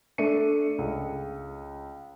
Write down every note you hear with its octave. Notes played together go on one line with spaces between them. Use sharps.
A3 D4 E5 C#7 D#7
C#2